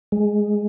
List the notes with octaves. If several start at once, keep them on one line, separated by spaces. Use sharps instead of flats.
G#3